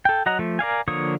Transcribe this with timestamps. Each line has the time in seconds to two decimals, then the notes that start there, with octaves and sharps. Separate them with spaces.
0.05 A4 G5
0.26 F#3 D#5 F#5 A#5
0.39 F3 A3
0.59 A#4 D5 F5 G#5
0.88 D3 F3 A#3 C#5 D#6